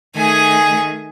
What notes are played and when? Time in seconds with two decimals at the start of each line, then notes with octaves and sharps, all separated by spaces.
0.16 D#3 A3 G#4 G#5